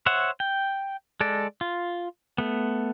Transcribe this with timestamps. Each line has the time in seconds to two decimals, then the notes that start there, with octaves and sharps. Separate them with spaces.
0.06 C5 C#5 E5 F#5
0.40 G5
1.21 G#3 A4 D5
1.61 F4
2.38 A3 B3